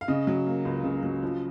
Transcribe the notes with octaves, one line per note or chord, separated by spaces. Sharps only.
F5
C#3 D#5
F#3
A#3
C#2
C#3
F#3
F3